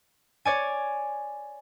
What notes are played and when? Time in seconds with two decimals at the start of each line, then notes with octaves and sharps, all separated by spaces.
0.45 C#5 D5 G#5